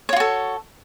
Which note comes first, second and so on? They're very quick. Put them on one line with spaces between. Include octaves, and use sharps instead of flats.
C#5 F4 F#4 A4